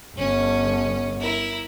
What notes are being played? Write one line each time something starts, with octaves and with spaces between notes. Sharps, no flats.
G1 C#4
E4 A#4